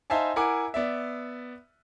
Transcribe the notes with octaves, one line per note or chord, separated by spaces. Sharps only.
D#4 C5 E5 F5 G#5 A5
E4 A#4 F#5 G#5 D6
B3 D5 E5